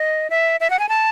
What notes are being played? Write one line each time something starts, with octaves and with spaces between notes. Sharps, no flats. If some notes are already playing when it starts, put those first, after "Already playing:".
Already playing: D#5
E5
E5
F#5
G#5
A5